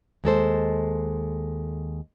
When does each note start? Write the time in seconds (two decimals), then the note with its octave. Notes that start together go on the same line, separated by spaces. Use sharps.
0.24 D#2 G#3 A4 C5